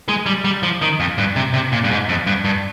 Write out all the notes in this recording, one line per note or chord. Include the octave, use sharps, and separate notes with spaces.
G#3
G3
G3
F3
D#3
F2
G2
C3
C3
A#2
G2
G#2
F2
G2
G2